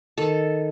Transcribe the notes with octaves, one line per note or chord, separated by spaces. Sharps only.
D#3 A4